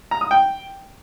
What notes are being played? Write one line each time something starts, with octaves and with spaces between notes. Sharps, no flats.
A#5
D#6
G5